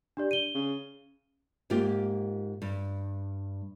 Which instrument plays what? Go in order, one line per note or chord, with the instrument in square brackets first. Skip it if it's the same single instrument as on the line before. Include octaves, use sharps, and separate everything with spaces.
[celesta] D4 G4 D5
D#7 G7
[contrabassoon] C#3
[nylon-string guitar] G#2 A#3 F4 G4
G2